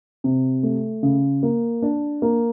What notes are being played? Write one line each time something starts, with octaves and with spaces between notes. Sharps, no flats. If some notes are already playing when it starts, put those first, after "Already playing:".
C3
A3
C#3
A#3
D4
A#3